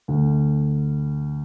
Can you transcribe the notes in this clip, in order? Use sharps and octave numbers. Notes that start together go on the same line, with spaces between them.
D2